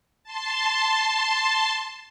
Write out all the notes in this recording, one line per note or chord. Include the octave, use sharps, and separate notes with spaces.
A5 C6